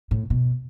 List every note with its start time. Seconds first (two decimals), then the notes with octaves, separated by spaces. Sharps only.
0.11 A2
0.30 B2